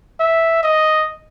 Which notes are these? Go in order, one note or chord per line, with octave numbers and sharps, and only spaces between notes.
E5
D#5